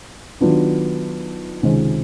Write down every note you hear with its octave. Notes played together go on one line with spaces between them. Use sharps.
D#3 F#3 B3 D4 F4
C#2 C3 D#3 G#3 C4